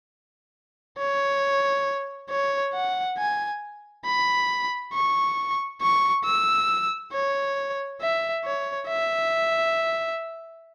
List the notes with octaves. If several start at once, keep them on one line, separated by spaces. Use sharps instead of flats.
C#5
C#5
F#5
G#5
B5
C#6
C#6
E6
C#5
E5
C#5
E5